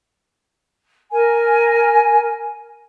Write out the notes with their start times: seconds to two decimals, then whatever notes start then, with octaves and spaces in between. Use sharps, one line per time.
1.11 A#4 G#5